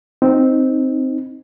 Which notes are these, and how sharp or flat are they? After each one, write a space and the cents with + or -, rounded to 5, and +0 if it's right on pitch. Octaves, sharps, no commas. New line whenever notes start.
C4 +0 D#4 +0